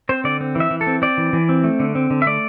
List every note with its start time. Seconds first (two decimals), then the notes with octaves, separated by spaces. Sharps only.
0.09 C4 C5
0.24 D3 D5
0.41 C4
0.55 E3
0.60 E5
0.71 E3
0.81 A4
0.87 C4
1.02 C4 D5
1.18 E3
1.33 E3
1.49 C4
1.64 A3
1.80 D3
1.95 C4
2.10 D3
2.22 E5
2.26 A3 D5